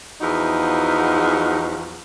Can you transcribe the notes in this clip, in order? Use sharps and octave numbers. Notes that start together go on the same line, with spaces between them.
E2 F3 D#4 F#4